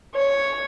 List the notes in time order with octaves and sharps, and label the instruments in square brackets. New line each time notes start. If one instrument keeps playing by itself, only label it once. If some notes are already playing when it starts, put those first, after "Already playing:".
[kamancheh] C#5